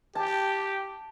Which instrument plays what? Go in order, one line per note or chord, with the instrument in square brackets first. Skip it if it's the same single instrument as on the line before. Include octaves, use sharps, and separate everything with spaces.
[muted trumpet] G4 [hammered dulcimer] A5